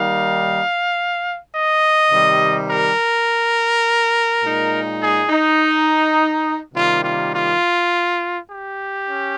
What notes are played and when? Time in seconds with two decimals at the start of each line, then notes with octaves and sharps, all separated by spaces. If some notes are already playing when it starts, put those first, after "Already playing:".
Already playing: D#3 G3 A#3 D#4 F5
1.53 D#5
2.11 C3 D#3 G3
2.69 A#4
4.43 A#2 G#3 D#4
5.01 G#4
5.29 D#4
6.74 C3 D#3 G3 A#3 F4
7.04 F4
7.33 F4
8.48 G4
9.06 C#4